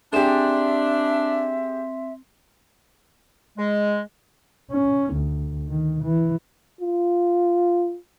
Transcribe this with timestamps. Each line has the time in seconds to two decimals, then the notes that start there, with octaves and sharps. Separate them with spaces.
0.13 C4 D4 G4 G#4 E5 C6
3.58 G#3
4.72 C#4
5.14 D2
5.69 D#3
6.04 E3
6.81 F4